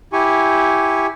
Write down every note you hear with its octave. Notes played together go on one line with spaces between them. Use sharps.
E4 G4 G#5 C#6